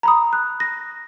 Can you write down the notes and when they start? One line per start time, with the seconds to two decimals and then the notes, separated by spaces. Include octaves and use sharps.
0.03 A#5 B5 D#6
0.33 F#6
0.60 A#6